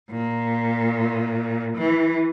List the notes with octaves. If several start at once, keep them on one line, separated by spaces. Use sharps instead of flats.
A#2
E3